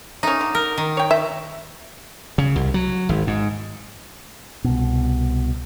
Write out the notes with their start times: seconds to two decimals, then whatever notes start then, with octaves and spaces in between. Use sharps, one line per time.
0.23 A3 C#4 D#4
0.41 D3
0.55 A#4
0.78 D#3
0.97 C#5 G5
1.11 E5
2.38 C#3
2.56 C2
2.74 F#3
3.09 G#1
3.27 G#2
4.64 C2 B2